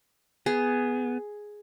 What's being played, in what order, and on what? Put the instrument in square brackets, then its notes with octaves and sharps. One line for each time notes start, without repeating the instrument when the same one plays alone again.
[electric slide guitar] B3 [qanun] G#4